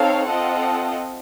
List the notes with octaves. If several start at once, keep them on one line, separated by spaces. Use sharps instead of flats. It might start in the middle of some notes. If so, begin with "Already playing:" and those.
Already playing: C4 D#4 A4 C#5 F5
C4 F4 A4 D#5 F#5